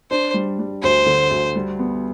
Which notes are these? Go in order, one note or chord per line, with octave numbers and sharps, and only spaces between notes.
D4 C5
G3
G3
D2 C5
D3
D2
G3
B3